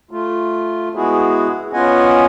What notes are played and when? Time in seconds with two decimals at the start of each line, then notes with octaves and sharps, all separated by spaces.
0.11 A3 F4
0.95 G#3 B3 E4 F#4 G#4
1.73 B3 C#4 F4 D#5 F#5 G#5